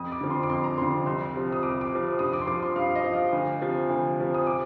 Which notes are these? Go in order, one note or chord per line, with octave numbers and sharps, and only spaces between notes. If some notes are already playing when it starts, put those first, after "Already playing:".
Already playing: F2 D#6
D6
D3 F3
C6
D6
F2 C6
A#5
D3 F3 C6
C2 C6
C3 F3
D#6
C2 D6
D6
C3 F3
G2 D#6
D6
C6
F3 D6
C6
G2 F5
D#5
F3
F5
D2
C3 F3
D2
C3 F3
D#6
D6